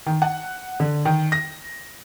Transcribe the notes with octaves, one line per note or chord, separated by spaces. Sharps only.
D#3
F#5
D3
D#3
A#6